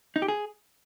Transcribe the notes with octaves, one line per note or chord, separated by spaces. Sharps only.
D#4
G4
G#4